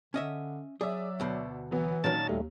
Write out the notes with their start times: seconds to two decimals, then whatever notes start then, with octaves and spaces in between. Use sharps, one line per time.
0.14 D3 C#4 D#5 E5
0.81 F#3 G#4 D5 E5
1.20 D2 B2 C5
1.71 E3 F#3 B3
2.04 A#2 D#3 F#3 C#4 D#4 A5 A6
2.29 D#2 G3 A3